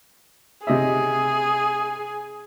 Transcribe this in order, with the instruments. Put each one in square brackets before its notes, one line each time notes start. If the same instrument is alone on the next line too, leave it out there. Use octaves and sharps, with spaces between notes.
[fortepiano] C3 D#5 E5 [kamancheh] G#4